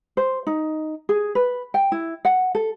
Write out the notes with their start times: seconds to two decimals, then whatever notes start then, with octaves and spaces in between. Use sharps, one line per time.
0.17 C5
0.47 D#4
1.09 G#4
1.35 B4
1.74 G5
1.92 E4
2.25 F#5
2.55 A4